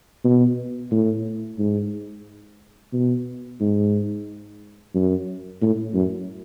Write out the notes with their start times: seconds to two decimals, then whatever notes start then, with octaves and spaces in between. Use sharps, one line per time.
0.24 B2
0.91 A2
1.59 G#2
2.93 B2
3.60 G#2
4.95 F#2
5.61 A2
5.94 F#2